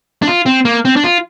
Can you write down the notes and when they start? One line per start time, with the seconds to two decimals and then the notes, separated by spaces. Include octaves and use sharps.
0.22 D4
0.28 F4
0.46 C4
0.65 A#3
0.85 C4
0.96 D4
1.04 F4